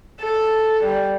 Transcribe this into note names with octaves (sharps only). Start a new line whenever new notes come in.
A4
G3